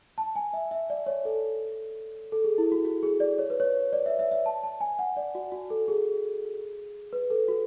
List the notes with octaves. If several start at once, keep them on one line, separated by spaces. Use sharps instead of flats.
A5
G#5
E5
E5
D5
C#5
A4
A4
G#4
E4
F#4
F#4
G#4
D5
C#5
B4
C#5
D5
E5
E5
E5
A5
A5
G#5
F#5
D5
F#4
F#4
A4
G#4
B4
A4
F#4